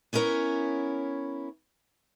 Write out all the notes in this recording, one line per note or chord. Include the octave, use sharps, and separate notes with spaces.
B3 C#4 E4 A#4 C#5